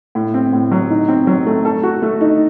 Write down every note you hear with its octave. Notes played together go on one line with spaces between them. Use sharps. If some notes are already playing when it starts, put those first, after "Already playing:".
A2
C4
A2
F#3
D#4
C4
F#3
A3
A4
F#4
A3
D#4